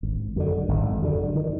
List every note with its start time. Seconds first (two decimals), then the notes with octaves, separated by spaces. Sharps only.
0.03 G#1
0.36 F#2 D3
0.68 G#1
1.02 F#2 D3
1.35 D#3